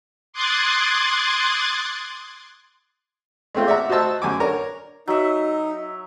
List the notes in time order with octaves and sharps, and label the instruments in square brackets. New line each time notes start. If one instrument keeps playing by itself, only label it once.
[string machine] C6 D6 D#6 F#6 G#6 A6
[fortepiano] G#3 A3 C4 F4
D5 E5 F#5 A#5
F#4 C5 D#5 A5 E6
F#2 G#5 D6
D4 A#4 C#5
[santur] F#3 E5 [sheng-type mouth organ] D#4